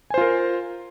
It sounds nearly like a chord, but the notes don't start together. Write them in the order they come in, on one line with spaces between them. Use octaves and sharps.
G#5 C5 F4 A#4